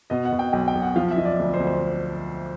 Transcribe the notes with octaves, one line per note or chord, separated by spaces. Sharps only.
B2 D#5
F#5
B2
G5
B1 G5
G5
B1
F#5
F3 F5
E5
F3 D#5
D5
D2
C5
D2
C5